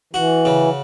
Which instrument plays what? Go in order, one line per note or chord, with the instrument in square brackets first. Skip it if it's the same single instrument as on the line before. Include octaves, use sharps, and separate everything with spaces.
[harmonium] E3 [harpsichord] F#4
[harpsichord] C#3